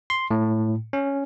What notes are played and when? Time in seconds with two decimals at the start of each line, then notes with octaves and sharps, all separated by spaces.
0.10 C6
0.31 A2
0.93 C#4